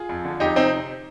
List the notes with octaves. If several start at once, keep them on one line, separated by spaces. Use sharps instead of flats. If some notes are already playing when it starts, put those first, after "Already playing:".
Already playing: F4 G#4
F2
D3
F2 D#4 G4
C3 C4 D#4